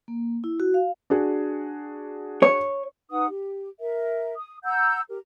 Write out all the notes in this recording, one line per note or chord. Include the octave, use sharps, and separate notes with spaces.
A#3
E4
F#4
F5
D4 F#4 G#4
C#5
D#4 B4 F#5 D#6
G4
A#4 E5
D#6
F#5 A#5 E6 G6
G4 A#4